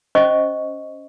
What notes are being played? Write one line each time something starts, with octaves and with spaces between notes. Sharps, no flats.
C#4 C5 D#5 C#6